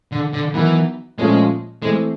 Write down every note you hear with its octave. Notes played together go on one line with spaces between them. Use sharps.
D3
D3
D#3 E3 F#3 B3
A#2 F3 G#3 A3 C#4 F4
E3 G#3 A3 C4